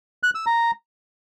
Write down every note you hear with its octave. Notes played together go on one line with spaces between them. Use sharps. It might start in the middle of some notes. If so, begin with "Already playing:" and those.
F#6
E6
A#5